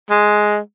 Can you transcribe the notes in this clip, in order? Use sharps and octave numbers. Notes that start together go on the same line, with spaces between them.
G#3